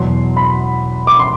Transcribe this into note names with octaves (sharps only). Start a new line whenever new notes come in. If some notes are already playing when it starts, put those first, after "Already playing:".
Already playing: E2 B2 F#3 C6
B5
D6
C6